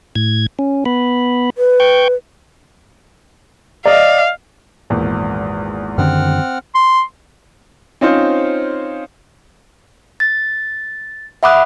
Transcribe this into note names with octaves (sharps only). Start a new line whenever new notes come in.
A2 G#6
C#4
B3 B5
B4
G5 C#6 G6
D5 D#5 F5
G#1 E2 A#2
F#2 D3 D#3 C4 F#5 F6
C6
C4 C#4 D#4 F4 C5
A6
E5 F#5 B5 D6 D#6 F#6